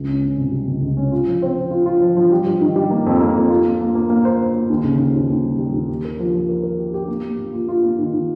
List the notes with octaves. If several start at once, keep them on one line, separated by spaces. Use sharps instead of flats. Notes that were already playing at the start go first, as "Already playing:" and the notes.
Already playing: C#2
C#4
C#4
C3
G3
C#2
C#2
C#4
F4
F3
C4
F4
F4
F4
F3
F3
G3
G3
D#3
G3
A#3
F2
A#3
F2
F4
A#3
A#3
A#3
A#3
C5
C5
A#3
D#2
C#3
D#2
D#2
D#2
G3
G3
D#2
G4
A#4
F3
F3
A#4
A#4
G4
G4
A#3
A#3
A#3
F4
F4
A#3
D#3
D#3